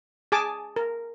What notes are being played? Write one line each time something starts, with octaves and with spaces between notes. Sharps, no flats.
G#4 G#5 A5 D6
A#4